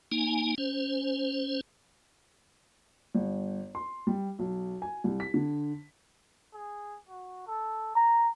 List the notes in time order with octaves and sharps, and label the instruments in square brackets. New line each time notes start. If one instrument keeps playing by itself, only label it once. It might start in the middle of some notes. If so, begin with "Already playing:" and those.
[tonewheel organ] A#3 D#4 G#5
C#4 C5
[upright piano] G1
C6
G3
B1
G#5
C2
B6
D3
[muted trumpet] G#4
F#4
A4
A#5